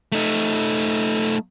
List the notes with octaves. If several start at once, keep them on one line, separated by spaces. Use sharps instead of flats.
A3 D#4